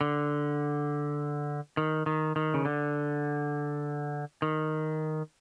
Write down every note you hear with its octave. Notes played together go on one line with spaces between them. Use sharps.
D3
D#3
D#3
D#3
C#3
D3
D#3